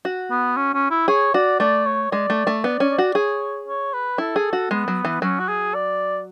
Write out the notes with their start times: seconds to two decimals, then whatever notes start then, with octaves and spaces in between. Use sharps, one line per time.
0.05 F#4
0.31 B3
0.57 C#4
0.74 C#4
0.91 E4
1.08 G#4 C#5
1.34 F#4 D5
1.60 A3 D5
1.86 C#5
2.11 G#3 D5
2.30 A3
2.47 A3
2.64 B3 D5
2.80 C#4
2.90 D5
2.98 F#4
3.15 G#4 C#5
3.68 C#5
3.94 B4
4.18 E4 A4
4.36 G#4
4.53 F#4
4.70 G#3 B3
4.88 F#3
5.05 E3
5.22 F#3 C#4
5.39 F#4
5.49 G#4
5.74 D5